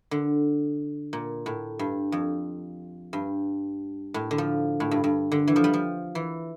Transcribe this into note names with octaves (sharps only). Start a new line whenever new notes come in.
D3
A#2
A2
G2
F2
G2
A2
D3
F3
A2
G2
G2
D3
E3
F3
G3
F3
E3